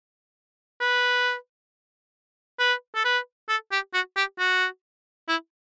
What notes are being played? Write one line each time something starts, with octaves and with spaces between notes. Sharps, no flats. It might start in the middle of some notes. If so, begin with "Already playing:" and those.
B4
B4
A4
B4
A4
G4
F#4
G4
F#4
E4